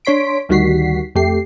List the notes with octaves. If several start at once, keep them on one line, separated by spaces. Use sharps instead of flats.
D4 C#5 C6 B6 D7
D2 D#3 G3 F#4 B6 C7
F2 A3 G4 C7